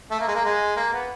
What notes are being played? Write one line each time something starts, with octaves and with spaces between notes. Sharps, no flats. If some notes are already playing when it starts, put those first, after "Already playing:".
A3
A#3
G#3
A#3
G#3
A#3
B3